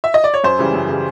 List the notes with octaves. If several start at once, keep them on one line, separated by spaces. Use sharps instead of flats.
E5
D#5
D5
C#5
F#2 C5
C#3 E3 G3
F#2
C#3 E3 G3